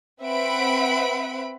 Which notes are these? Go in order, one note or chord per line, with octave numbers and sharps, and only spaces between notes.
C4 B4 E5 F#5 B5 D7